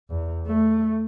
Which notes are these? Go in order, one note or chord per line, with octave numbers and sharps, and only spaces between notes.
E2
A3